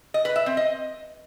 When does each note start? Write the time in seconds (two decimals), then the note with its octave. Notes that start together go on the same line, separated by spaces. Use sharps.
0.14 D#5
0.25 B4
0.36 E5
0.46 C4
0.57 D#5